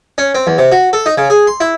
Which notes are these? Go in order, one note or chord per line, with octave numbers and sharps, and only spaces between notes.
C#4
C4
E2
C3
F#4
A4
D#4
C#3
G#4
C6
E4